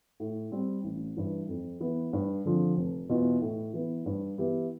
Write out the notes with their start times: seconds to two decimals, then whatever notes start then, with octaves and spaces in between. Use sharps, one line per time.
0.20 A2
0.52 G3 C4
0.84 A1
1.17 G2 E3
1.49 F2
1.80 E3 B3
2.13 G2
2.45 D3 F3 C4
2.77 F1
3.09 E2 B2 B3 F4
3.41 A2
3.74 E3 B3
4.06 G2
4.38 E3 B3 E4 G4